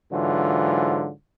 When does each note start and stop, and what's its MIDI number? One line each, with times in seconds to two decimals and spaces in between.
0.12 1.10 44
0.12 1.10 50
0.12 1.10 52
0.12 1.10 54
0.12 1.10 65